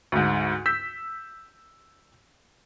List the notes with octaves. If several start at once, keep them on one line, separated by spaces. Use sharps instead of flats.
D2 G#2
E6 G6 B6